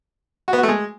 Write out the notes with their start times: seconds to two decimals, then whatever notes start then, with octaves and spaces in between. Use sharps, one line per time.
0.48 F#4
0.53 B3
0.58 F#4
0.63 A3
0.68 G#3